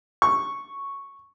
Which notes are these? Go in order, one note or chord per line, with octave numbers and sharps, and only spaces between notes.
C#6